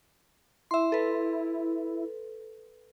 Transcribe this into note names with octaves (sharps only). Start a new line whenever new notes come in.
E4 E5 C6
A4 B4